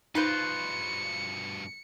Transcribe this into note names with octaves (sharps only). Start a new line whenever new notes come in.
G2 B2 D#4 F4 B4 C5 C#7